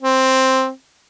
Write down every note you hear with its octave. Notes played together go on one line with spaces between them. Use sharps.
C4